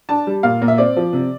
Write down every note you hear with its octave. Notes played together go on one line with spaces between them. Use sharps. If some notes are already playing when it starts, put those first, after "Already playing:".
D4 A5
G3
A#2 F5
A#2
E5
C4 D5
F3
C3